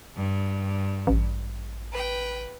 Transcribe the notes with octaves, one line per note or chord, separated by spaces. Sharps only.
G2
A1
B4 G5